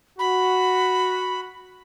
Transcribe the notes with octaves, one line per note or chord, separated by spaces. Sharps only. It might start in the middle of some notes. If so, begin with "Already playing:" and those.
F#4 B5